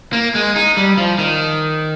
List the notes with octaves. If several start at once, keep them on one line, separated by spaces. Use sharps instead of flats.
A#3
G#3
D#4
G3
F3
D#3